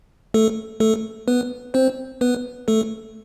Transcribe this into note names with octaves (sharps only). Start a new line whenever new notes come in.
A3 A4
A3 A4
B3 B4
C4 C5
B3 B4
A3 A4